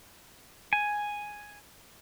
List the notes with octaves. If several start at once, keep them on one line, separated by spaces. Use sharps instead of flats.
G#5